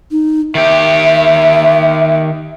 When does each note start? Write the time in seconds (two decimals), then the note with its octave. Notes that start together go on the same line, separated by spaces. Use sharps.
0.11 D#4
0.55 D#3 G4 E5